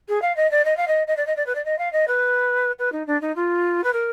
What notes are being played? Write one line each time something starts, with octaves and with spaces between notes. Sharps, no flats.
G#4
F5
D#5
D5
D#5
F5
D#5
D#5
D5
D#5
D5
B4
D5
D#5
F5
D#5
B4
B4
D#4
D4
D#4
F4
B4
A#4